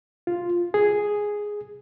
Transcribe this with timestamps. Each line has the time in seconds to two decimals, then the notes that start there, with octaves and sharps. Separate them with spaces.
0.27 F4
0.74 G#4